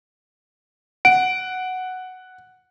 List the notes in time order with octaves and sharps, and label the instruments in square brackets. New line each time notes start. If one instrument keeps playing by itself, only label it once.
[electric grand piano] F#5 [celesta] D7